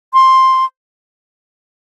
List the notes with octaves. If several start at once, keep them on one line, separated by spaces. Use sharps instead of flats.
C6